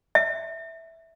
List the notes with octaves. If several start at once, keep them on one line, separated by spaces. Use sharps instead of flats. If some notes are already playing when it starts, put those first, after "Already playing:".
E5